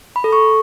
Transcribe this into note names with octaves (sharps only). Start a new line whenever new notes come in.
B5
A4
C#6